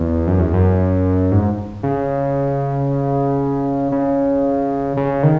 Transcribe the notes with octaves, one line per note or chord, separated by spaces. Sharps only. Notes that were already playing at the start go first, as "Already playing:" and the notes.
Already playing: E2
F#2
E2
F#2
G#2
C#3
C#3
C#3
D#3